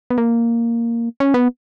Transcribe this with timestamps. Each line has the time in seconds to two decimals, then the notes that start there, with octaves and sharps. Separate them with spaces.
0.10 B3
0.18 A#3
1.20 C#4
1.34 B3